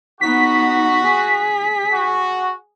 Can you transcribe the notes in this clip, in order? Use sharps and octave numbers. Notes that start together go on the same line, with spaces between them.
B3 D#4 F#4 B6
G#4
F#4